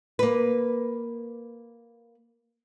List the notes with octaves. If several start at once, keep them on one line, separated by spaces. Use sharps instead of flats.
A#3 B4